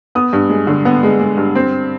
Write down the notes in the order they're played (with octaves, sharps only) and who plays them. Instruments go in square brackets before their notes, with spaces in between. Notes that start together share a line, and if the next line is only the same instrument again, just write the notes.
[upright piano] B3 D#6
G2
G#3
D3
B3
G#3
G#3
G2
C4